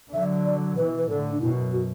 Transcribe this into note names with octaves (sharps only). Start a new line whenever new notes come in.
D3 F#3 E5
D5
B2 E3 B4
B4
A2 D3 A4
D4
F#2 B2 E4
F#4